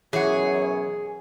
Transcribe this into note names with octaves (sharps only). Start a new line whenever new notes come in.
F#2 B2 E3 G#4 C#5 F#5